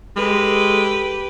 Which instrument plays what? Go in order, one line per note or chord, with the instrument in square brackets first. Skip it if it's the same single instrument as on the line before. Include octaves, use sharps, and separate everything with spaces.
[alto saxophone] G#3 [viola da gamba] G4 B4 [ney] A4